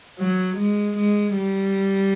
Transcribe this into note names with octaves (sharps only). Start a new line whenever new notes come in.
F#3
G#3
G#3
G3